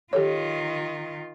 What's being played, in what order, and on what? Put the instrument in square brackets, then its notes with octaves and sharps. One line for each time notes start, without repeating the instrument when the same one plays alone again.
[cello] D#3 F4 [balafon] G4 A4 C#5